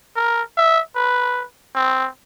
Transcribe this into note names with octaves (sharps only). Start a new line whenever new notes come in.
A#4
E5
B4
C4